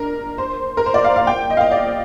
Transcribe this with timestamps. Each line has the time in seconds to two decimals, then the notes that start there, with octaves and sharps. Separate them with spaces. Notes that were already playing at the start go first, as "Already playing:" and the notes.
Already playing: D4 A#4
0.38 C5
0.77 A#4
0.86 C5
0.94 D5
1.04 F5
1.16 F5
1.27 G5
1.50 D#5
1.57 F5
1.61 D#5
1.72 D5